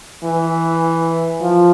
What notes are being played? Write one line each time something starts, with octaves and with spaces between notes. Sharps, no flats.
E3
F3